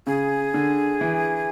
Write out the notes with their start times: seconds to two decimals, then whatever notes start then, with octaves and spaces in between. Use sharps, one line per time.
0.07 C#3 G#4
0.54 D3
1.01 E3